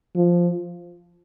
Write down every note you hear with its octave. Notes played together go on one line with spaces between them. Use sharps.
F3